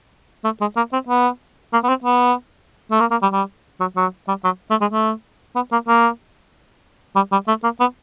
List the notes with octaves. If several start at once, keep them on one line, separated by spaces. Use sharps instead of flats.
A3
G#3
A#3
C4
B3
A#3
B3
C4
B3
A3
A#3
A#3
G3
G3
F#3
F#3
G3
F#3
A3
G#3
A3
B3
A#3
A#3
G3
G3
A3
A#3
B3